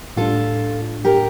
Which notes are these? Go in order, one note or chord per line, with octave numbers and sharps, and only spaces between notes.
A2 G3 D4 F4 A4
G4 A#4